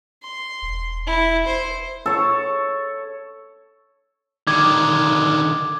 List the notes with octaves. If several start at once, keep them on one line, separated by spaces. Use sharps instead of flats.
C6
E1
E4
C5
A4 C#5
D3 D#3 D6 G#6